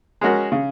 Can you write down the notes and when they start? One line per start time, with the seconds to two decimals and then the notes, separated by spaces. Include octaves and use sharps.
0.21 G#3 C#4 F#4 A#4
0.52 C#3